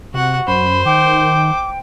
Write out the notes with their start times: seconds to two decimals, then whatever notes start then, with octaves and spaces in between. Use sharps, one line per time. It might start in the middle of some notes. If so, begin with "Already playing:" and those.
0.14 C3 F#4 F#5
0.47 F#2 C5 B5
0.85 D#3 G5 D6